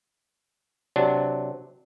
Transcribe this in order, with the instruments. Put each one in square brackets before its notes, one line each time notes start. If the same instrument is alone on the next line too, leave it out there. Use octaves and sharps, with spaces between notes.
[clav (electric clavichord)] C3 F#3 D4